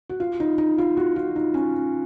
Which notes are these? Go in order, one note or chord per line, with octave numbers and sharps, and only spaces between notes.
F#4
F4
D#4
D#4
F4
F#4
F4
D#4
C#4